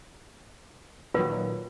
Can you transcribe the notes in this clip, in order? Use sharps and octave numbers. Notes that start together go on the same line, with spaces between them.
A#2 D#3 F#3 F4 B4